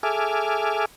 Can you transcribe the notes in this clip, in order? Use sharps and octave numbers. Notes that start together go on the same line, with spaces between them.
G#4 A4 E5 G#5 D6 F6